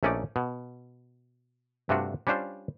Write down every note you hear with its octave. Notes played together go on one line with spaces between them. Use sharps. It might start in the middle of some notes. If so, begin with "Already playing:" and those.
A#1 A3 C#4 D#4 D5
B2
G2 C3 A3 D4 F4 F#4
G3 C#4 D4 F4 C5